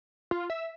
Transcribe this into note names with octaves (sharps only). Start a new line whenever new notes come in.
F4
E5